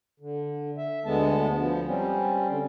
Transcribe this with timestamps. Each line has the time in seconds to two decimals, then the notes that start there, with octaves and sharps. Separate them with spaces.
0.20 D3
0.77 E5
1.05 D2 D3 G#3 B3 A5
1.58 F3 B3
1.86 G3 C4 C#4
2.48 D3